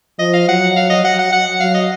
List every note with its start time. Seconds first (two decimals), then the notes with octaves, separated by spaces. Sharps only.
0.19 F3 D#5
0.34 F5
0.48 F#3 F#5
0.76 F5
0.90 D#5
1.04 F#3 F#5
1.19 F#5
1.32 F#5
1.60 F#3 F5
1.74 D#5